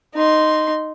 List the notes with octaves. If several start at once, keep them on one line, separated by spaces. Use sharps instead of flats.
D#4 C6